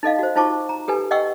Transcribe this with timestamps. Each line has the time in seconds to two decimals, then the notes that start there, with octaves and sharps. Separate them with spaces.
0.03 D#4 A4 D#5 F5
0.19 F#4 C5
0.36 D#4 F4 C5 A5 C#6 D6
0.69 A#5
0.88 G4 A4 B4 G#5
1.11 D#5 F#5 G5 C#6 E6